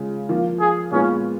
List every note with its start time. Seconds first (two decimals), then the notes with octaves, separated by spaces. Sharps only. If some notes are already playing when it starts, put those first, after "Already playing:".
Already playing: C#3 G#3 C#4 F4
0.29 F3 A#3 F4
0.60 G#4
0.92 A#2 G#3 B3 C#4 F4